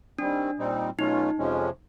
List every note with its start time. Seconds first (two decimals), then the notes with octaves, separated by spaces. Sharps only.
0.19 D#3 G3 C4 D4
0.58 A#2 G3 C4 D#4
0.98 B2 F#3 A3 C#4 D#4 F4
1.38 F2 C3 F3 G#3 C#4